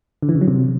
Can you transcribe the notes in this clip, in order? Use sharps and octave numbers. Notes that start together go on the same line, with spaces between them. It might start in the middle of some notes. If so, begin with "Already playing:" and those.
D3
E3
C#3
F#3
C3